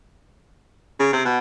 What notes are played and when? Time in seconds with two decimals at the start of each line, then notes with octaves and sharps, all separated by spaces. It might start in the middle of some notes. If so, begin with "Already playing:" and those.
0.99 C#3
1.13 C3
1.25 B2